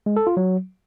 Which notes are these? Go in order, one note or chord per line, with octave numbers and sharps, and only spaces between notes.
G#3
A4
F4
F#3